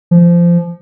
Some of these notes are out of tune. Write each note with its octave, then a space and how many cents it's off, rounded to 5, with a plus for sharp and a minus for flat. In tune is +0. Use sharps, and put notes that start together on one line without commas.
F3 -20